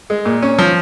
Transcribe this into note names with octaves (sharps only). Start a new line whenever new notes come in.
G#3
A#2
C#4
F3